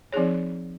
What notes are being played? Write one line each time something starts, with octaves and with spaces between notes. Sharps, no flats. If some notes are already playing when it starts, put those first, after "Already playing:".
F3 C4 D#4 G#4 C#5